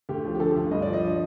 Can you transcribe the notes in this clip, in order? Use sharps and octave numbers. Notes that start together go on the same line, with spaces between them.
D2 G4
F3
G4
D3 A4
D2
G2 D#5
D5
F3
D#5
D3